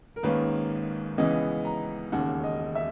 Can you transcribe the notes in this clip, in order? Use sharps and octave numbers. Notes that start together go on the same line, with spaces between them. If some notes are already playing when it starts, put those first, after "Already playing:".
A#4
G#1 G#2 D#3 A#3 C#4 B4
C#2 C#3 E3 B3 D#5
A#5
E1 D#2 C#3 F#5
D#5
E5